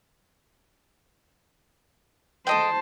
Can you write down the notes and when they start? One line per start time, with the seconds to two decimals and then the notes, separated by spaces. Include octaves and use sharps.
2.47 A4 C5 D#5 G5 A5